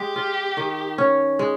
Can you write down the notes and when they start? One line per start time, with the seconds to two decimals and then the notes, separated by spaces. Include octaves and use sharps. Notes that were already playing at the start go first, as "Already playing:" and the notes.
Already playing: G#3 G4
0.16 F4
0.57 D#3
0.98 C#4
1.39 G#3